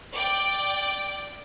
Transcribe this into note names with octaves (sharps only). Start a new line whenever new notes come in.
D5 G5